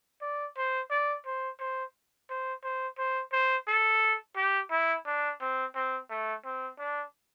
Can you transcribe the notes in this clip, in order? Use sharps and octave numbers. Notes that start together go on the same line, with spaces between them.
D5
C5
D5
C5
C5
C5
C5
C5
C5
A4
G4
E4
D4
C4
C4
A3
C4
D4